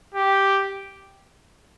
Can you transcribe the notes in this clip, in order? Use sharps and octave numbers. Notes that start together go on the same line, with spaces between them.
G4